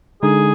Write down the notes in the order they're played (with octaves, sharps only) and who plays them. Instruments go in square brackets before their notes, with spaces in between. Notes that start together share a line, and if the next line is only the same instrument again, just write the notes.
[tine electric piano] D3 G#3 D#4 [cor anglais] G#4